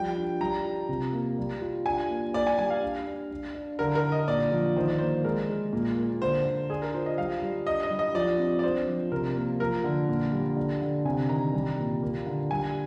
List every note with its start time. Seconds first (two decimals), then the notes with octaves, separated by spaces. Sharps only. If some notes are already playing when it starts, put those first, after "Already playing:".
Already playing: F3 G3 G5
0.16 D4
0.40 G3 A#5
0.65 F4
0.89 C3
1.13 A#3
1.38 G3
1.62 F4
1.86 D4 G#5
2.10 A#3
2.34 A#3 D5
2.47 G#5
2.58 G3 G#5
2.70 F5
2.83 D4
3.07 D4
3.31 D4
3.55 D4
3.79 D3 A#4
3.95 A#4
4.03 D3
4.12 D#5
4.28 A#2 D5
4.52 F3
4.76 D#3 C5
4.87 D5
4.98 A#3 C5
5.24 G#3 A#4
5.49 G#3
5.73 A#2
5.97 A#3
6.22 D3 C5
6.46 D3
6.69 D4 G#4
6.82 A#4
6.94 F4 C5
7.06 D#5
7.18 G3 F5
7.43 G3
7.67 D4 D#5
7.83 D#5
7.91 G3
7.99 D#5
8.15 F3 D5
8.39 C4
8.59 D5
8.63 D4 C5
8.87 F3
9.12 C3 A#4
9.36 A#3
9.60 F3 A#4
9.84 D3
10.09 A#2
10.33 G3
10.56 D3
10.82 D3
11.05 C3 G#5
11.29 D#3 A#5
11.54 G3
11.79 A#2
12.03 A#3
12.26 D3
12.51 G3 G#5